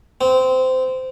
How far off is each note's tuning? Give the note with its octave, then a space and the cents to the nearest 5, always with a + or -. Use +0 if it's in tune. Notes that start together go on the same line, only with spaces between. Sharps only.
C4 -20